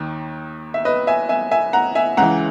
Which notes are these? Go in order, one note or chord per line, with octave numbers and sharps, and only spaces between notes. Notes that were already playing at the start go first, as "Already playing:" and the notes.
Already playing: D#2 D#3
E5
B4 D#5
E5 G#5
E5 G#5
E5 G#5
F#5 A#5
E5 G#5
C#2 C#3 E3 F#5 A#5